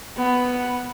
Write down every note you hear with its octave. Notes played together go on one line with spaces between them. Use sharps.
B3